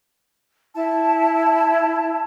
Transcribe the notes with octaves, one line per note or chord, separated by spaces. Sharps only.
E4 A5